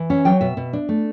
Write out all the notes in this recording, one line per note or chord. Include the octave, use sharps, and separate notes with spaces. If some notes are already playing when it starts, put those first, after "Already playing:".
Already playing: E3
C#4 E5
F#3 G5
B2 E5
B2
D4
A3